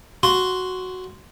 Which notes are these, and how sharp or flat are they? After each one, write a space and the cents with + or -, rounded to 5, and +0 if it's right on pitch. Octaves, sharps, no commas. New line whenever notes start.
F#4 +0 C6 -10